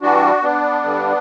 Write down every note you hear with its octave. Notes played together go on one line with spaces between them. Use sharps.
G2 E3 G3 D4 F#4
B3 D4
G2 D3 G3